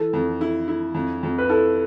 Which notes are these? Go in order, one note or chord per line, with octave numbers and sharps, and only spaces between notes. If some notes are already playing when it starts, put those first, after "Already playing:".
Already playing: E3 A4
F2
E4
E4
F2
F2
B4
E4 A4